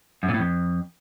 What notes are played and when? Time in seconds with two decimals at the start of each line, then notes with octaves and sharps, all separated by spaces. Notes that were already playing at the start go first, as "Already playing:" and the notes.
0.23 F#2
0.28 A#2
0.34 A2
0.40 F2